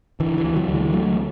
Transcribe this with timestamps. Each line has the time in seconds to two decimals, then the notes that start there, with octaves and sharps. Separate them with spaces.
0.20 D3 E3
0.37 E3
0.44 D2
0.56 D3 F#3
0.68 D2
0.74 E3 G#3
0.92 D3 F#3 A3